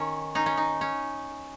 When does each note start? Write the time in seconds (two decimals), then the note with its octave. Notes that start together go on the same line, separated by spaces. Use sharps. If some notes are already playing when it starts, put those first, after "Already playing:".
Already playing: D#3 C#4
0.35 C#4 D#4
0.46 C#4
0.57 D#4
0.81 C#4